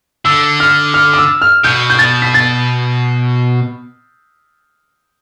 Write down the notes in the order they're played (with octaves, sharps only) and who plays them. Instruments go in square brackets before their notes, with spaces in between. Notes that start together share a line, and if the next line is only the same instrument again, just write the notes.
[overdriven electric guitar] D3 [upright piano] E6
[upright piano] F6
F6
D6
E6
F6
[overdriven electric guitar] B2 [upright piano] G6
[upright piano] G6
A6
B6
A6